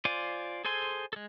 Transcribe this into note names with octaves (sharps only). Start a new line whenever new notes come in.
F4 C5 D5 G#5
G#4 A4 C5 G#5 C6
G#3 A4